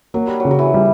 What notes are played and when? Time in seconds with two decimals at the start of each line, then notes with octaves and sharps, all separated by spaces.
0.14 F#3 A#3
0.27 G3
0.40 C#3 F#3
0.51 F#3
0.59 E3
0.74 G3